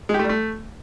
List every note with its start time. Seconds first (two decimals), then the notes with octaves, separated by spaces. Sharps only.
0.09 G#3
0.14 G4
0.19 A3
0.24 G3
0.29 A3